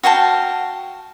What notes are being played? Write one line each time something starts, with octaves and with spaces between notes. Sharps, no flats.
F#4 F5 G5 A5